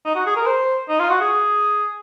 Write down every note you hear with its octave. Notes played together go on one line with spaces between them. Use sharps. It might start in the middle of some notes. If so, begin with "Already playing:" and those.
D#4
F#4
G#4
A#4
C5
D#4
F4
F#4
G#4